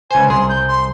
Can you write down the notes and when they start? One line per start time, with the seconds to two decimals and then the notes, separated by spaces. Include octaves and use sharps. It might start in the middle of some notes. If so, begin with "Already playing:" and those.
0.11 C#2 C5 G#5
0.29 C2 G#4 C6
0.49 G6
0.68 C6